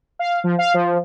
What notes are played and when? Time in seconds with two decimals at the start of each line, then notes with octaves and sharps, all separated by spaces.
0.19 F5
0.44 F3
0.58 F5
0.74 F3